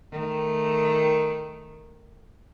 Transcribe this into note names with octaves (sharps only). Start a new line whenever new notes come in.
D#3 A3